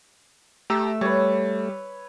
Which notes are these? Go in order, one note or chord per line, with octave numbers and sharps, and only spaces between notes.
A3 G4 A#5 E6
G3 B4 C#5